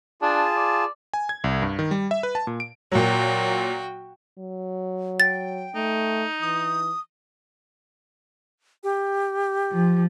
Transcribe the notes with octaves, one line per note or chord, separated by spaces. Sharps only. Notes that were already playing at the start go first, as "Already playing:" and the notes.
D4 F4 G#4 A5
D5
G#5
G#6
C2
G2
D#3
G3
E5
B4
A5
A#2
D7
A#2 F#3 F#4 G5
F#3
G5 A6
A3 D#4
E3 D#6
G4
F3